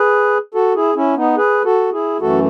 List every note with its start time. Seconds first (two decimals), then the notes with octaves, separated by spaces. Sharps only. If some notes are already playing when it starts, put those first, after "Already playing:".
Already playing: G#4 B4
0.54 F#4 A4
0.75 E4 G#4
0.95 C#4 E4
1.17 B3 D#4
1.37 G#4 B4
1.64 F#4 A4
1.92 E4 G#4
2.20 F#2 E3 A3 F#4 A4